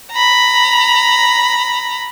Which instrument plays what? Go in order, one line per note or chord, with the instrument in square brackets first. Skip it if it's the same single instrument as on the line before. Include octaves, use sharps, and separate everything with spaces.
[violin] A#5 B5